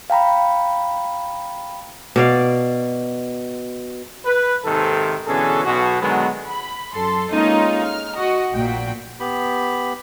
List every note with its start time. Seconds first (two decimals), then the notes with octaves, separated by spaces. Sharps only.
0.10 F5 G5 A#5 B5
2.16 B2 D5 F5
4.26 B4
4.64 D#2 G#2 C3 D#3 A4
5.27 B2 D3 E3 C#4 G#4 A4
5.65 B1 B2 F#4
6.01 D3 D#3 F#3 G#3 B3
6.50 B5
6.92 F#2 A4 C6
7.30 G#3 A#3 C#4 D#4 F4
7.84 F6
8.15 F#4 D#5
8.54 A#1 A#2 F#4 G5
9.20 B3 G4 B5